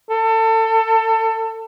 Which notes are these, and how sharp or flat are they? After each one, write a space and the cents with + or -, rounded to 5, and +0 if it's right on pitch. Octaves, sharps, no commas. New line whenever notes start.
A4 +25